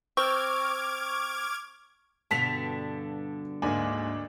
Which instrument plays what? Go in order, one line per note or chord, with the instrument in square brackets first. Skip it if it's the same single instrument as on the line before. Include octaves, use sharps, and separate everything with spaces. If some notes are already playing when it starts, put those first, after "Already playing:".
[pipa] C4 [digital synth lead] C#6 [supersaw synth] D6 F6 G#6
[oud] G2 B2 D3 [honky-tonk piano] A5 B6 F7
[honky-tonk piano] D2 D4 [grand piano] G#2 A#3 G#5